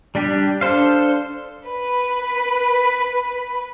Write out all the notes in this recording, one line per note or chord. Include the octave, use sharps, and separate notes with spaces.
G3 D4 G4
D4 A4 C5 F5
B4 B5